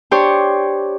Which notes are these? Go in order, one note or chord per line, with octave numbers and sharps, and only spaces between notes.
D4 G4 C5 C#5